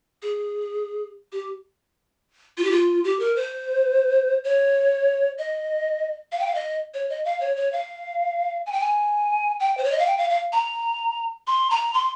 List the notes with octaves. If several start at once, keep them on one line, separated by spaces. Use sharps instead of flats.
G#4
G4
F4
G4
F4
G4
A#4
C5
C#5
D#5
F5
G5
F5
D#5
C#5
D#5
F5
C#5
C#5
F5
G#5
G5
G#5
G5
C5
C#5
D#5
F5
G5
F5
F5
A#5
C6
A#5
C6